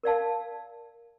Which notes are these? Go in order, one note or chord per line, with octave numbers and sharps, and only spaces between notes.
A#4 D5 F5 A5